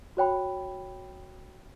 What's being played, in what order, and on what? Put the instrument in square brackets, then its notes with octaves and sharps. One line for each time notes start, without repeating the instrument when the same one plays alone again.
[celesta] F#4 C#5 G5 B5